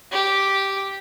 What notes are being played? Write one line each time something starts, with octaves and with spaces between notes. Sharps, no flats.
G4